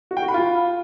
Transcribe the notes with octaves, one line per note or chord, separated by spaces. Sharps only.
F#4
G5
F#4
B5
F4